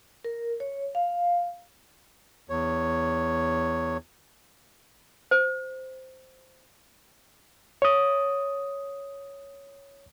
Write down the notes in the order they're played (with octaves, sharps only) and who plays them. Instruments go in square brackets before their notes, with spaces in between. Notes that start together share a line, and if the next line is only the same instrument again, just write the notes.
[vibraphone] A#4
C#5
F5
[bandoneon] E2 C#5
[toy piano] C5
[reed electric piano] C#5 D#6